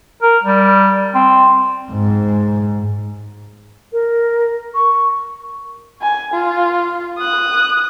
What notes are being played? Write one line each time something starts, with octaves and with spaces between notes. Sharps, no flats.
A#4
G3
C4
G#2
A#4
C#6
G#5
F4
D#6 F#6